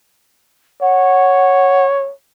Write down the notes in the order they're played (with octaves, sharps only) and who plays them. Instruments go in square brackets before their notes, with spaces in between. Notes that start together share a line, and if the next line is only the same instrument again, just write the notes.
[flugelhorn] C#5 [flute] F#5